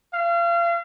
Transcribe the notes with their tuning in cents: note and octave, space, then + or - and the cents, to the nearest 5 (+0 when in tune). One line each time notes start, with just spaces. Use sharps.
F5 -35